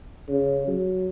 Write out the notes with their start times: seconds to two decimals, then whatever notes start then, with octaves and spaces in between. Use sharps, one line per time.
0.28 C#3
0.67 F#3